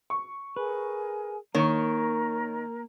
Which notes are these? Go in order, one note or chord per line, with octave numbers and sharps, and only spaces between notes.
C#6
G#4 A#4 B4 G#5
D#3 A#3 A#4 C#5 A#5 C#6